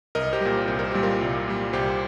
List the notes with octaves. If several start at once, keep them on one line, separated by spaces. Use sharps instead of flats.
C2 A#4 D#5
G4 C5
A#2 G3
C2 C5
A#4
A#2 G3 G4
F4 A#4
C2
A#2 G3
C2 G4 C5